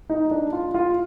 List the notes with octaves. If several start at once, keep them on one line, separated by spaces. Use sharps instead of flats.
D#4
D4
F4
F4